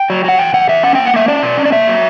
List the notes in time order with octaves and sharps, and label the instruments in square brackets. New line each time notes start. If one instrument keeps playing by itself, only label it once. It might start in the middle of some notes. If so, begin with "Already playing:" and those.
Already playing: [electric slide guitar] G5
F#3
F#3 F#5
E2 G5
E2 F#5
E2 E5
C#4 F#5
A#3 G5
F#5
A#3 E5
C#4 D5
B2
C#4
D5
A#3 E5
F#3